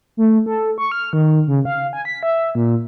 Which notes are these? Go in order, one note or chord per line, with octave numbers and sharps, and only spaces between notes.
A3
A4
C#6
F6
D#3
C#3
F5
G#5
B6
E5
A#2